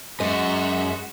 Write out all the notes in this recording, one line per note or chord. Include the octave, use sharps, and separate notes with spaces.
F#2 G#3 F#4 E5